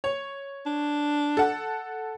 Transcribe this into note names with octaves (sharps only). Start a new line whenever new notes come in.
C#5
D4
A4 F#5